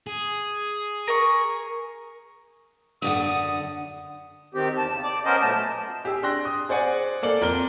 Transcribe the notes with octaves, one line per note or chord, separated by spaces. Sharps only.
G#4
A#4 C#6
F#2 D3 F#5 D#6
D#3 C4 G4
E2 A5
C#3
D5 D6
B3 C#4 A#4 C5 D#5
F#2 A#2 A3 B3 A5
G4 G#4 E6
D4 G5 C6 F#6 A#6
D#6
G#4 C5 D5 F#5 G#5
A#3 A4 D5 F#7
F2 A#4 G7